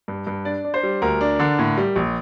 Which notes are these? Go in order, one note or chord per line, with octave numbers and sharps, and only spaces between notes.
G2
G2
D4 D5
D4
C5
G3
D2 A#4
D4
D3
A2
G3
A#1